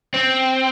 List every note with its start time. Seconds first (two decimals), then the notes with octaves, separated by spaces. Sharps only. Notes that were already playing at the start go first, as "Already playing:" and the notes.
0.14 C4